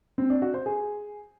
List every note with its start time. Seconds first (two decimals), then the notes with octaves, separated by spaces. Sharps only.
0.18 C4
0.30 D4
0.42 F#4
0.54 C5
0.66 G#4